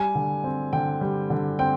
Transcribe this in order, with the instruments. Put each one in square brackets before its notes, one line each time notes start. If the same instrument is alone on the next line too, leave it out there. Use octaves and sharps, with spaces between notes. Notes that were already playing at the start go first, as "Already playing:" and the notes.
Already playing: [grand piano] G3 G#5
D3
C4
D3 G5
G3
D3
C4 G5